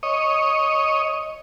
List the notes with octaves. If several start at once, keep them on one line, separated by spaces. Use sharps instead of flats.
C#5 D#5